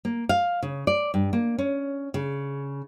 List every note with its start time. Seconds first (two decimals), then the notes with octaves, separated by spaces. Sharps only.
0.05 A#3
0.29 F5
0.63 C#3
0.87 D5
1.14 G2
1.33 A#3
1.58 C#4
2.14 C#3